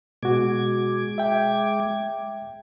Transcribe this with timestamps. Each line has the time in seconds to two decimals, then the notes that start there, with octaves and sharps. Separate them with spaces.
0.23 B2 G#3 F#4 D6 G#6
1.18 E5 G5